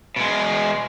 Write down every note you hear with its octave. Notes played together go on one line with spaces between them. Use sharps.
B2 G#3